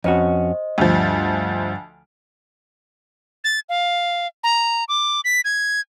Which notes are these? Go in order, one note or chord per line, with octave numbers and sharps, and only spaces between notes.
F2 C#4 F#4 C5 D#5
D2 G2 F3
A6
F5
A#5
D6
B6
G#6